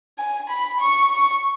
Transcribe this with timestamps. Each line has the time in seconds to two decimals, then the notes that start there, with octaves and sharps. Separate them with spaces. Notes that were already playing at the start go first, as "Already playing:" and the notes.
0.19 G#5
0.50 B5
0.81 C#6
1.12 C#6